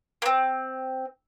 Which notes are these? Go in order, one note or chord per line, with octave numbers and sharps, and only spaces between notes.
A#3 C4